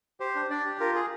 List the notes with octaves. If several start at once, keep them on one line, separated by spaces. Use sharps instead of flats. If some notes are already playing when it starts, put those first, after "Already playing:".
G4 C5
D4
D4 D5
G4
F4 A#4
G#4